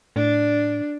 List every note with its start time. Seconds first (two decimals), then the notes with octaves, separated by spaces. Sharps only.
0.16 A2 D4